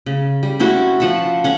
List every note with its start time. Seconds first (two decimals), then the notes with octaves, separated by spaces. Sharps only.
0.06 C#3
0.43 G3
0.59 C4 C#4 E4 F#4
1.00 F3 F#5 A5 B5
1.44 C#4 F#5